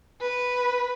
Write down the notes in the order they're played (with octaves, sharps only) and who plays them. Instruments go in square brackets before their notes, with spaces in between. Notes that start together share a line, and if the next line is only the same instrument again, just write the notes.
[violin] B4